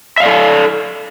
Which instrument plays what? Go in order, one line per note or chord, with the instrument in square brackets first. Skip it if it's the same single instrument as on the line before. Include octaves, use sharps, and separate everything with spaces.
[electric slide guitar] E5
F5
D5
A4